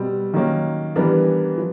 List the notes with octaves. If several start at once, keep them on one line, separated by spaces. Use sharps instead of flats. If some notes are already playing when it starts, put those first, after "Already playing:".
Already playing: B2 G3 C4
D#3 F#3 A#3 C#4
E3 G3 B3 D4 A#4
F3